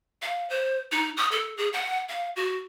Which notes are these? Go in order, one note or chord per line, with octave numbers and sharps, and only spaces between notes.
F5
C5
D#4
D#6
A4
G#4
F#5
F5
F#4